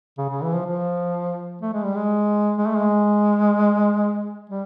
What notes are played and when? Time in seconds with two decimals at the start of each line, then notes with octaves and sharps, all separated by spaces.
0.18 C#3
0.30 C#3
0.42 E3
0.54 F3
0.66 F3
1.62 A3
1.73 G#3
1.84 G3
1.95 G#3
2.58 G#3
2.68 A3
2.77 G#3
4.50 G3